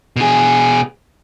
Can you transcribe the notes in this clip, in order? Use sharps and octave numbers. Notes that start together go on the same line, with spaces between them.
B2 G#4